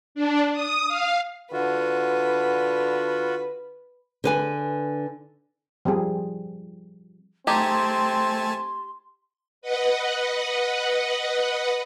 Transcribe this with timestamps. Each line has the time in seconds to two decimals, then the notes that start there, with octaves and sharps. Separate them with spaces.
0.15 D4
0.53 D#6
0.88 F5
1.53 D3 F4 F#4 B4
4.24 D3 B4 G#5
5.85 F3 G3 C4 G#4
7.47 A3 C4 D#4 G4 G#4 G#5 A5 C6
9.62 B4 D#5 F#5